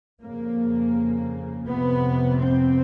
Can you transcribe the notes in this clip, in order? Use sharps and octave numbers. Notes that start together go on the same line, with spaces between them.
F2 C#3 A#3
F2 C3 B3
C4